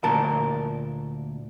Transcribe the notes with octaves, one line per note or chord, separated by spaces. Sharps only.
D2 A#2 A#4 A5